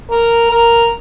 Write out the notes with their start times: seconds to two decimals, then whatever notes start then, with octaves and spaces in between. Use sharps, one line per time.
0.10 A#4
0.51 A#4